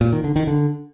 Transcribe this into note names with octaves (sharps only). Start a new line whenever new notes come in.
A#2
D#3
D3
D#3
D3